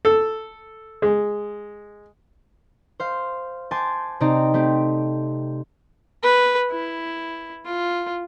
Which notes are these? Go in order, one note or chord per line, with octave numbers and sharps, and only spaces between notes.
A4
G#3
C5 F5
G#5 A5 C6 D6 G6 A6
C3 C4 D#4 D5 A#5
A3 C4 G4
B4
E4
F4